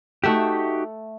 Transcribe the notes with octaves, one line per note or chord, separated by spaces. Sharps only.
A3 D#4 F#4 G4 E5 F#5